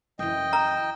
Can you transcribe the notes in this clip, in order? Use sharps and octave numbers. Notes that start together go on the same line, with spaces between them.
F#2 E3 D#5 G5
A#5